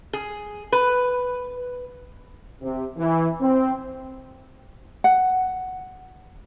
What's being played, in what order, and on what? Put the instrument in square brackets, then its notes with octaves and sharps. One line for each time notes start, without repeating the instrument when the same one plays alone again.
[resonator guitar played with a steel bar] G#4
B4
[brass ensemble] C3
E3
C4
[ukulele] F#5